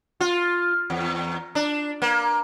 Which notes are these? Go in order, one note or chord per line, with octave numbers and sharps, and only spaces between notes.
F4
E2
D4
A#3